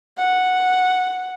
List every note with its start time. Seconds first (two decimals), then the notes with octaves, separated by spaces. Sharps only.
0.18 F#5